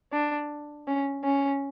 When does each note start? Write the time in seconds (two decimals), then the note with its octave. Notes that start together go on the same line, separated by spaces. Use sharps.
0.11 D4
0.87 C#4
1.25 C#4